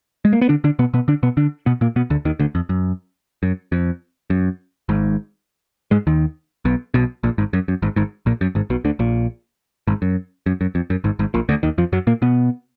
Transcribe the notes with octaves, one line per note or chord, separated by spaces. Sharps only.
G#3
A#3
B3
D3 D4
D3 D4
B2 B3
B2 B3
D3 D4
B2 B3
D3 D4
B2 B3
A#2 A#3
B2 B3
D2 D3
D#2 D#3
D2 D3
F2
F#2
F#2
F2
F#2
G#1 G#2
G#2 G#3
D#2 D#3
B1 B2
B1 B2
A#1 A#2
G#1 G#2
F#2
F#2
G#1 G#2
G#1 G#2
A#1 A#2
F#2
G#1 G#2
B1 B2
D2 D3
A#1 A#2
G#1 G#2
F#2
F#2
F#2
F2
F#2
G#1 G#2
G#1 G#2
A#1 A#2
D2 D3
D#2 D#3
F2 F3
F#2 F#3
A#2 A#3
B2 B3